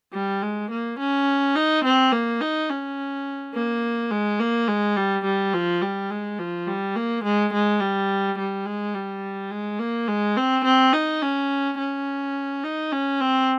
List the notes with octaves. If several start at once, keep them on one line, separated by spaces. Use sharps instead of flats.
G3
G#3
A#3
C#4
D#4
C4
A#3
D#4
C#4
A#3
G#3
A#3
G#3
G3
G3
F3
G3
G#3
F3
G3
A#3
G#3
G#3
G3
G3
G#3
G3
G#3
A#3
G#3
C4
C4
D#4
C#4
C#4
D#4
C#4
C4